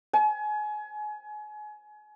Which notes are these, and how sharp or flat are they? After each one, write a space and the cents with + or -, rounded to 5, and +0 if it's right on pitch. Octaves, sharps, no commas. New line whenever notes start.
G#5 +30